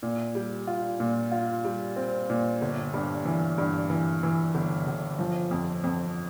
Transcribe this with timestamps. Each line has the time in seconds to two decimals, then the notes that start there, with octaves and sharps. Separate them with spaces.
0.03 A#2
0.35 G3
0.67 F4
1.00 A#2
1.32 F4
1.64 G3
1.96 C4
2.30 A#2
2.62 G1
2.94 G2
3.25 E3
3.58 G2
3.90 E3
4.23 E3
4.55 G1
4.87 G1
5.19 F3
5.51 F2
5.84 F2